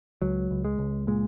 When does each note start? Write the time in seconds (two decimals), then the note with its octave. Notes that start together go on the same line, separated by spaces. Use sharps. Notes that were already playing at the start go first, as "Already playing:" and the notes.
0.22 C#2 F#3
0.51 C#2
0.65 G#3
0.79 C#2
1.07 A#2 G#3